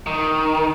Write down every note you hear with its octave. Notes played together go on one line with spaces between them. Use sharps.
D#3